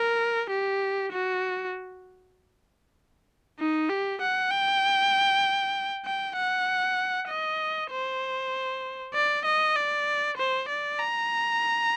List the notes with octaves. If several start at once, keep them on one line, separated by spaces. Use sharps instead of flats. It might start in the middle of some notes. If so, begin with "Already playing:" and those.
Already playing: A#4
G4
F#4
D#4
G4
F#5
G5
G5
F#5
D#5
C5
D5
D#5
D5
C5
D5
A#5